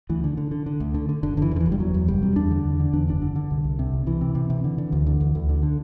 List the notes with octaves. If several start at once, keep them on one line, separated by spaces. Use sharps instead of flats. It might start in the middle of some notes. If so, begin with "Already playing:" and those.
D2 E3
D3
D3
D3
D3
D2
D3
D3
F#1 D3
F#1 D3
E3
E2 D3
E3
F#1
G3
E2 F#3
E2
F#1 G3
C3
E2 D4
D3
E2
D3
E2 D4
F#1 D4
D3
D3
C2
C2
C3
C2
C3 E3
C3
C3
C3
D3
D3
D2
D3
D2
D2
D3
D3